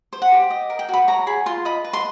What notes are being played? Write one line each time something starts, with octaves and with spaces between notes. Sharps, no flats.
C5
F#5
G4
D#5
A#4
G5
F#4 B5
C#5 A#5
G#4 B5
F4 C6
D#5 B5
B4
C6